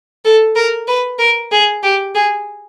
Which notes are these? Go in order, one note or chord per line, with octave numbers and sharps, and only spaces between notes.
A4
A#4
B4
A#4
G#4
G4
G#4